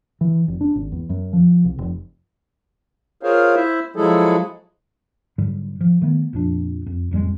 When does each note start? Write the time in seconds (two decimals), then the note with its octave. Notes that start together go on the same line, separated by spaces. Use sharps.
0.21 E3
0.48 F1
0.61 D4
0.76 G#1
0.92 E2
1.10 F#2
1.33 F3
1.65 C2
1.78 F1
3.23 F4 G#4 A#4 C5 C#5 F5
3.55 E4 C5 E5
3.96 F3 F#3 G#3 E4 G#4 A4
5.38 G#2 D3 F#3 G3
5.81 F3
6.02 D#3 A3 B3
6.33 A#1 F2 D4
6.86 F2
7.11 A1 F2 G3 G#3